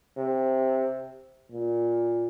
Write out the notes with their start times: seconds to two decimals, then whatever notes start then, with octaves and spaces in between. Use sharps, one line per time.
0.17 C3
1.52 A#2